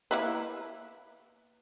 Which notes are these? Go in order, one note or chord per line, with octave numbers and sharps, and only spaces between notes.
A#3 E4 B4